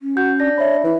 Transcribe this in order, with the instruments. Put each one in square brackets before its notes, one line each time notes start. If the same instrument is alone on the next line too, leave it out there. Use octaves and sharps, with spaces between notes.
[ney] C#4
[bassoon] F#4 [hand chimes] G6
[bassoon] D4 [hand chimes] A#6
[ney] C#5 [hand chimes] E5 B5
[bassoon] E3 [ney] E4